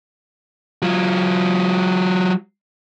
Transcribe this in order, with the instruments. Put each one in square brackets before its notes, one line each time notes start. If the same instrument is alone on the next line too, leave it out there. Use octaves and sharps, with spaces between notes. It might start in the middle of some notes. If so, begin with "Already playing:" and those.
[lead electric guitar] F#3 F4